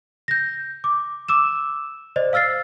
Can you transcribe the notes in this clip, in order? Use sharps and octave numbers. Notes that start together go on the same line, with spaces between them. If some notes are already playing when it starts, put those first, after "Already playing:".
G6 A#6
D6
D6 E6 E7
C5 D5 D#5
F5 E6 F6 A6 C7